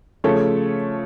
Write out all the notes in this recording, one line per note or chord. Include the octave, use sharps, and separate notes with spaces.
C#3 F3 A3 A4 C#5